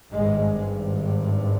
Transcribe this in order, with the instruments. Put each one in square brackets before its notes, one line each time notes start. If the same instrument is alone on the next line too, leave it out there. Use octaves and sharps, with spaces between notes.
[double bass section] G#1 G2 G#3